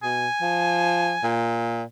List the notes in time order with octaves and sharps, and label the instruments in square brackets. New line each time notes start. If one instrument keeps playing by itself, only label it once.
[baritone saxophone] B2 [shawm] G#5
[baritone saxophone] F3
A#2